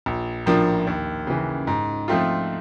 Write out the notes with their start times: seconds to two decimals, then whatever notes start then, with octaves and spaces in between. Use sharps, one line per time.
0.06 A#1
0.46 A2 F3 A#3 D4
0.87 D#2
1.27 C#3 E3
1.67 G#2
2.08 F3 A3 C4 F4